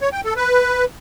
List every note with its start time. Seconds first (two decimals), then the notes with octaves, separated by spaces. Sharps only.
0.01 C#5
0.13 G5
0.24 A4
0.36 B4